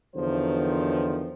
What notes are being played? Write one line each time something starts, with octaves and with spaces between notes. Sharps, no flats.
E2 D3 D#3 F3 F#3 C5